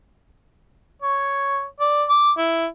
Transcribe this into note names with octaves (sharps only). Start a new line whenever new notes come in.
C#5
D5
D6
E4